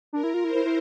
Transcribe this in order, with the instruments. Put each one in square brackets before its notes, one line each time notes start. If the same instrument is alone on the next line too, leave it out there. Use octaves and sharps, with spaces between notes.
[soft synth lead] D4 [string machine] A#4
[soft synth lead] E4
F4
[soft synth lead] E4 [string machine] C5
[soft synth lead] E4
E4